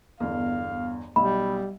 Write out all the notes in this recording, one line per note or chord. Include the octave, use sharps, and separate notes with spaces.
G1 E2 F5
B1 G3 B5